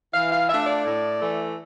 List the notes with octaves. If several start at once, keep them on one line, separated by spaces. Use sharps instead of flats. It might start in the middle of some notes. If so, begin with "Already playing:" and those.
E3 F5
F5
A3 D4 F4 E5
D5
A2
E3 A3